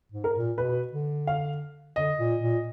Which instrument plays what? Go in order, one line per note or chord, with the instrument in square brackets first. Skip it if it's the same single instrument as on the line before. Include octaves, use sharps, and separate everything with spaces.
[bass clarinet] G#2
[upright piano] A#4
[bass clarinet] A#2
[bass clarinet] B2 [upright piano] B4
[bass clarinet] D3
[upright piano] F5
[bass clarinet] D3 [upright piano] D#5
[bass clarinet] A#2
A#2